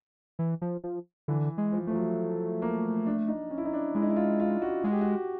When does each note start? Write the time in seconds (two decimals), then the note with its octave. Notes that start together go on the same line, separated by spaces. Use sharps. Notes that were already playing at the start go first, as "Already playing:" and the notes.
0.39 E3
0.62 F3
0.84 F3
1.28 D3 E3
1.58 G#3
1.72 F3
1.87 F3 A3
1.95 F#3
2.62 A#3
3.06 D4
3.28 D#4
3.50 C#4
3.58 E4
3.65 D#4
3.73 D4
3.95 G#3 E4
4.02 D#4
4.10 E4
4.16 F4
4.40 F4
4.62 F#4
4.84 G#3 F#4
4.92 G4
5.01 F#4